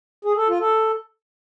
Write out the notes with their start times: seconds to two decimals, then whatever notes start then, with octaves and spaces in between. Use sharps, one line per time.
0.25 G#4
0.36 A4
0.48 F4
0.60 A4